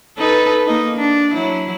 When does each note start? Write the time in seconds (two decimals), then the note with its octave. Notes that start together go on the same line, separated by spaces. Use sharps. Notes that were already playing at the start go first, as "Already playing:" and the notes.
0.18 D#4 A4 B4
0.66 A#3 D#4
0.96 D4
1.34 F#3 E4